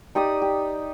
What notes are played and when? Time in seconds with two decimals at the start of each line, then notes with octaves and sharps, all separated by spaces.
0.15 D#4 G4 D5 D#6
0.42 G4